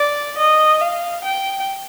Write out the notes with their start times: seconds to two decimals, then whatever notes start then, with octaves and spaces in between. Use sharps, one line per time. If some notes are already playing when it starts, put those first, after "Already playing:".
Already playing: D5
0.38 D#5
0.81 F5
1.24 G5